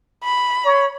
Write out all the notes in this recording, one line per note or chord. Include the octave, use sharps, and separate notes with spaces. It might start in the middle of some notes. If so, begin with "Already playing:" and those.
B5
C#5